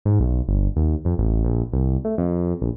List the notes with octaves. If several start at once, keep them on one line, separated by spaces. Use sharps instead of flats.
G#2
B1
G1
D#2
F2
A1
A#1
C2
A3
F2
A#1